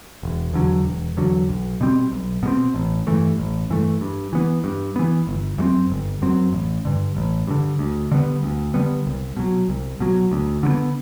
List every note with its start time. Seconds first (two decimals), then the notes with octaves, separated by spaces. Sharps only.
0.23 E1
0.54 E2 D3 F#3
0.85 E1
1.17 E2 D3 F#3
1.49 B1
1.81 B2 G3 C4
2.12 B1
2.43 B2 G3 C4
2.74 A1
3.07 G2 E3 A3
3.38 A1
3.70 G2 E3 A3
4.01 G2
4.33 E3 B3
4.64 G2
4.96 E3 B3
5.27 G1
5.58 F#2 F#3 C4
5.90 G1
6.22 F#2 F#3 C4
6.53 A1
6.85 G2 D3
7.17 A1
7.47 G2 D3
7.79 D2
8.12 D3 G3 B3
8.43 D2
8.74 D3 G3 B3
9.06 C2
9.37 B2 F#3
9.69 C2
10.00 B2 F#3
10.32 D2
10.63 D3 F#3
10.68 B3